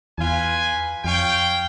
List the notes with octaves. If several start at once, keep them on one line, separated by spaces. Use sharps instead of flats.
E2 F4 B4 G#5
F2 C#5 F5 G5